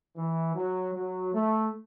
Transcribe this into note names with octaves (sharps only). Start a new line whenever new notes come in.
E3
F#3
F#3
A3